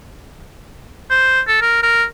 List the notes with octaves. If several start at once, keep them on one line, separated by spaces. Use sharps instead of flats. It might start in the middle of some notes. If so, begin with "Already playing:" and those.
C5
A4
A#4
A#4